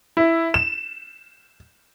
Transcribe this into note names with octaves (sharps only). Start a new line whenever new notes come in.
E4
E7